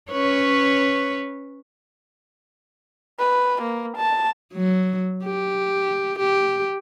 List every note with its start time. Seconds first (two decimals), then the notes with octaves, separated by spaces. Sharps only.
0.11 C#4 B4 C#5
3.19 B4
3.62 A#3
3.97 A5
4.53 F#3
5.25 G4
6.18 G4